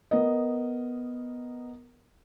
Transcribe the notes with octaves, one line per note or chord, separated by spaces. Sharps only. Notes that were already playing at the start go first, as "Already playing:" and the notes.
B3 A#4 D#5